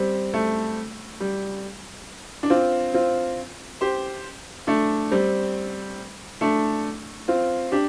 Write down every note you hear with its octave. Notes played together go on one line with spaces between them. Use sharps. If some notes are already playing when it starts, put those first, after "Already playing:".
Already playing: G3 C4
A3
G3
D4
C4 F4
C4 F4
G4 C5
A3 D4
G3 C4
A3 D4
C4 F4
D4 G4